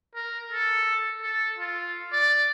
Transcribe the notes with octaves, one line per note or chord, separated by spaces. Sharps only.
A#4
A4
A4
F4
D5